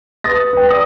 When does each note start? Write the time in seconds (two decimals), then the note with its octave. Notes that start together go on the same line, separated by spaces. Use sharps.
0.24 B4 D#6 A6 A#6
0.53 B4 G5
0.69 D5 D#6 A#6